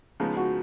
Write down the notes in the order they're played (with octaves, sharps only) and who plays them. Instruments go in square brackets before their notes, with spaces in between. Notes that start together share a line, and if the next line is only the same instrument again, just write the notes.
[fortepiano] C#3 F3 G#3 B3 D#4
[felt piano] F#4